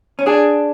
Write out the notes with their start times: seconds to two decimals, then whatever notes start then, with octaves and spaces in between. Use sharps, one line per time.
0.19 C#4
0.26 D4 G#4